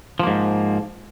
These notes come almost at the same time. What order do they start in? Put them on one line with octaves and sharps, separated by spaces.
F3 A#3 G#2